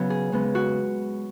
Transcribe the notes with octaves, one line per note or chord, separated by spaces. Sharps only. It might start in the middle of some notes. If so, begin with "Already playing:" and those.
Already playing: C#3 F#3 B3
G#4
C#3 G#3 B3
F#4